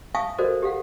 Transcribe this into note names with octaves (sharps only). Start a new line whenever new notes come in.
E5 F5 G#5 A5 C#6 D#6
F#4 A4 A#4 C5 D5 D#5
G4 A4 F5 F#5